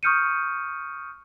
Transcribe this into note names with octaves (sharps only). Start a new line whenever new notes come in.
C#6 D#6 F6 G6 C#7 D#7